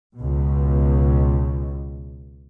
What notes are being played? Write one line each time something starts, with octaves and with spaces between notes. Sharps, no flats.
C#2 B2